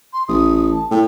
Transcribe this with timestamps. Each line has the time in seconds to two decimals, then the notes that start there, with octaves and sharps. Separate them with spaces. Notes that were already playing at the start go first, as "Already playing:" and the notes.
0.13 C6
0.28 A1 D#6
0.72 A5
0.91 A2 G5